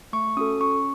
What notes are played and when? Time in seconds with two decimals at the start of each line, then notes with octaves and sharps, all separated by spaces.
0.13 A3 C#6
0.37 C#4 F#4 A4 D#6
0.60 C#4 C#6